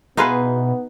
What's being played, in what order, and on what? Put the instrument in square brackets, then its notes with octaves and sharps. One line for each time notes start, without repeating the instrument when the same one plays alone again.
[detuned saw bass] B2 [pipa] E3 F5 C6 [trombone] B3 [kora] D#4 G#4 B4